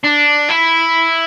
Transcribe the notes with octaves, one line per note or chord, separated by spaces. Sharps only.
D4
E4